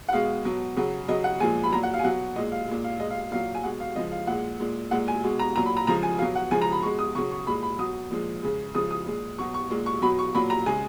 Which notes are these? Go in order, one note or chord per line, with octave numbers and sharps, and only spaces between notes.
F#5
B2 G#3 F5
B2 F#3
C#3 F#3
C#3 F#3 D#5
F#5
A#2 F3 G#3 G#5
B5
A#2 F#3 A#5
F#5
F5
G#5
B2 F#3 F#5
A#2 G#3 D#5
F5
A#2 G#3
F5
A#2 G#3 D#5
F5
F5
A#2 F#3 F5
G#5
B2 G#3 F#5
F5
C#3 F3 G#3 D#5
F5
A#2 G#3 F#5
A#2 G#3
A#2 G#3 F#5
G#5
B2 G#3
A#5
A#2 F#3 A#5
B5
A#5
C#3 F3 G#3 A#5
G#5
B2 F#3 F5
F#5
C#3 F3 G#3 G#5
A#5
B5
B2 G#3 C#6
D#6
C#3 F#3 C#6
C#6
A#2 G#3 B5
B5
B2 F#3 D#6
A#2 F3 G#3
C#3 G#3
C#3 F3 G#3 D#6
D#6
A#2 G#3
B2 F#3 C#6
C#6
A#2 G#3
C#6
B2 F#3 B5
C#6
A#2 F#3 B5
A#5
C#3 G#3 G#5